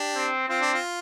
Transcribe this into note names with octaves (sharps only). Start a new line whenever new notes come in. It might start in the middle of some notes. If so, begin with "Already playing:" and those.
Already playing: D4 G4
C4
C4 F4
D4
F4